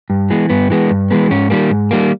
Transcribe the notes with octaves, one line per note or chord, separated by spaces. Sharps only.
G2
E3 G#3 B3
G2 B3
E3 G#3 B3
G2
E3 G#3 B3
G#2 C#4
D#3 G3 A#3
G#2
D#3 G3 A#3